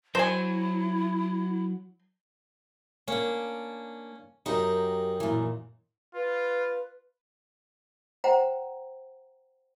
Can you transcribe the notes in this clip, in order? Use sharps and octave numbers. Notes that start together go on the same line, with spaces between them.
F#3 E4 C5 G#5
A#3 C#4 D4
F#2 D#4 G4 A#4
A#2 E3
F4 B4
C5 F#5 G5 A#5